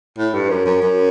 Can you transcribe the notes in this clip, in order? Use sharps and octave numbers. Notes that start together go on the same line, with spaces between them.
A2
G2
F#2
F#2
F#2